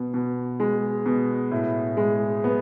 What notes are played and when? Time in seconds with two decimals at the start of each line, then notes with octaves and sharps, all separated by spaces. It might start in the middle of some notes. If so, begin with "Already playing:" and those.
Already playing: B2
0.14 B2
0.60 G#3
1.06 B2
1.51 A2
1.97 G#3
2.44 B3